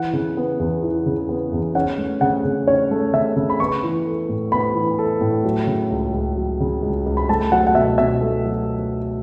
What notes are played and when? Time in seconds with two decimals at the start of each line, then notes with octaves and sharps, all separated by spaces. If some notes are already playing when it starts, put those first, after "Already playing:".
Already playing: E3 F#5
0.13 C#3
0.37 B3
0.60 E2
0.83 E3
1.06 C#3
1.29 B3
1.53 E2
1.75 C#4 F#5
1.98 A3
2.21 C#3 F#5
2.45 C#3
2.67 C#4 C#5
2.91 A3
3.13 C#3 E5
3.36 C#3
3.50 B5
3.60 B3 C#6
3.83 E3
4.06 A4
4.29 A2
4.52 B3 B5
4.75 E3
4.99 A4
5.21 A2
5.45 F#3
5.67 C#3
5.90 C#2
6.14 C#2
6.37 F#3
6.60 C#3
6.83 C#2
7.06 C#2
7.17 B5
7.29 A3 A5
7.52 F#3 F#5
7.67 F#5
7.75 B2 E5
7.98 B2 E5
8.21 A3
8.45 F#3